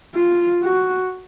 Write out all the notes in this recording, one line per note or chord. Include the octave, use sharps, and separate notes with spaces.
F4
F#4